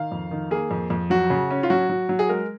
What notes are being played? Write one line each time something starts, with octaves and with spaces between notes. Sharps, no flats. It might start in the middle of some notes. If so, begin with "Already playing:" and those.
Already playing: D#3 F5
F2
D#3
A#3 G#4
F2
F2
F#3 F#4
C#3
C#4
F4
F#3 F#4
F#3
F#3
G#4
G#3 A#4